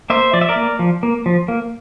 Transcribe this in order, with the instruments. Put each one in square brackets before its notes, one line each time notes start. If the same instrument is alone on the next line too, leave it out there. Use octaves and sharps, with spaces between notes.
[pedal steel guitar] A#3 C5 E5
F3 D5
E5
A#4 D5
A#3
F3
A#3
F3
A#3